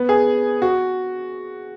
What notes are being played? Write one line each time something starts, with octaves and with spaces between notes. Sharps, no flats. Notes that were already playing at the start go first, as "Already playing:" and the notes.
Already playing: B3
G#4
F#4